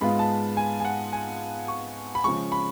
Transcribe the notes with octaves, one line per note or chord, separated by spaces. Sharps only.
G#2 G#3 B3 F4 B5
A5
G#5
G#5
F#5
G#5
C#6
B5
C#3 F3 G#3 C#6
B5